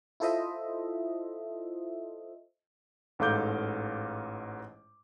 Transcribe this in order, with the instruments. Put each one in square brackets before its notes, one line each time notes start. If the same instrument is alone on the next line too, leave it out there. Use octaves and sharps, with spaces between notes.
[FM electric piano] E4 F4 A4 C5 D#5 E5
[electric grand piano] A1 G#2 A4 F5 D6 G6